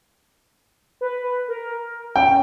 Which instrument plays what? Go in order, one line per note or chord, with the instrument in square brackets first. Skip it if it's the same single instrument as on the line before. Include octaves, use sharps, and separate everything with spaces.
[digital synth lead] B4
A#4
[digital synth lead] C#4 [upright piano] G5